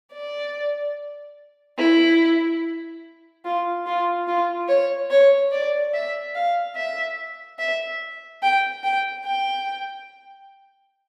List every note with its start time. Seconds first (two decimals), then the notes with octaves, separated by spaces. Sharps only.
0.14 D5
1.78 E4
3.45 F4
3.86 F4
4.28 F4
4.68 C#5
5.11 C#5
5.52 D5
5.94 E5
6.35 F5
6.76 E5
7.59 E5
8.43 G5
8.84 G5
9.25 G5